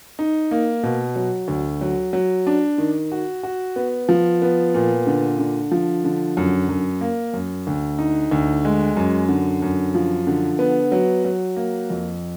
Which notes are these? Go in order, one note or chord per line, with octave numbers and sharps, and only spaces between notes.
D#4
A#3
B2
F#3
D2
F#3
F#3
D4
D#3
F#4
F#4
B3
F3
B3
A#2
D3
D3
F3
D3
F#2
F#2
A#3
F#2
D2
D#4
D2
G#3
F#2
D3
F#2
F3
D3
B3
F#3
F#3
A#3
F2